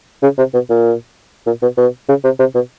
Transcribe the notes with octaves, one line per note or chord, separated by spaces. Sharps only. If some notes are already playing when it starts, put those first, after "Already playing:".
C#3
C3
B2
A#2
A#2
B2
B2
C#3
C3
C3
B2